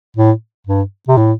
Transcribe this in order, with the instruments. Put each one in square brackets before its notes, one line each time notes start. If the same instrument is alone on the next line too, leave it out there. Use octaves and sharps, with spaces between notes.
[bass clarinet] A2
G2
C3
A2